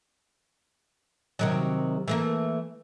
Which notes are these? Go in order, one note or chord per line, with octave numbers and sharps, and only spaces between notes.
C3 D#3 F#3
E3 A3 A#3